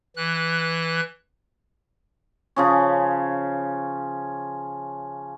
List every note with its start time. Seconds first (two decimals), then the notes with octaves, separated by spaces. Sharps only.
0.16 E3 F#6
2.56 C#3 F3 C#4